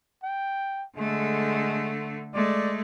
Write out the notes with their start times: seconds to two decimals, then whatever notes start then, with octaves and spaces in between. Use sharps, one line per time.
0.23 G5
0.97 D3 G#3 A3
2.34 G#3 A3 D5